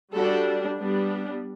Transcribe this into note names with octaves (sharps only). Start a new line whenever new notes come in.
G3 D4 F#4 A4
G3 B3 D4